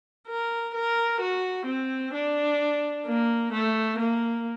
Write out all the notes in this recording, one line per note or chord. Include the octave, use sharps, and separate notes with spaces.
A#4
A#4
F#4
C4
D4
A#3
A3
A#3